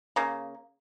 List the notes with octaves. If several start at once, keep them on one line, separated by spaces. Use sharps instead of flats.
C#3 A#3